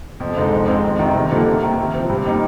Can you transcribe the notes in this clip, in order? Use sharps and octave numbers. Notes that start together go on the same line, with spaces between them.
F2
D3 G#3 C4 D#4
F2
D#3 G#3 C4
F2
C3 D#3
G2
D3 F3 A#3 D#4
C3
D#3 A#3
C3
F3 C4
G2
D#3 A#3 D#4